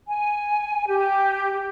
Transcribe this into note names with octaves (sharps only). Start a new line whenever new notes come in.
G#5
G4